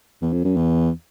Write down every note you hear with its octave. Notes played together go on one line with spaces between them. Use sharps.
E2
F2
F#2
E2